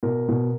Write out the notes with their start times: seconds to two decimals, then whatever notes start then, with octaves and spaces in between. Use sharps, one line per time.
0.03 B2 A#4
0.28 B2